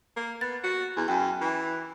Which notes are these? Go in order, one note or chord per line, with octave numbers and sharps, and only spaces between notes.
A#3
B3 A6
F#4
E2
F#2 G5 G#5
E3